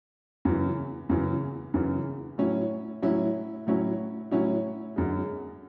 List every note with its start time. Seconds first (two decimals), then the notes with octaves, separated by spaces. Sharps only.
0.45 F#2 C#3 E3
1.09 F#2 C#3 E3
1.74 F#2 C#3 E3
2.38 A2 F#3 C#4 E4
3.02 A2 F#3 C#4 E4
3.67 A2 F#3 C#4 E4
4.31 A2 F#3 C#4 E4
4.96 F#2 D3 G#3